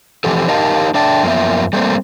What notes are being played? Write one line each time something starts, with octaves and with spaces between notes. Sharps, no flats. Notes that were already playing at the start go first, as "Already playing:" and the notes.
E3 F3 C4 G4 A4
D#4 G4 A#4 D#5 F5 A5
A3 D4 D5 E5 G5 A5
F#2 F3 A#3 B3 E5
G3 A3 A#3 C4